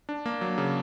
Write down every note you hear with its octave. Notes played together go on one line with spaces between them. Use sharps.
D4
A#3
F#3
C#3